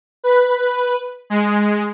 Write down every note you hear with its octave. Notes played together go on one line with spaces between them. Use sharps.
B4
G#3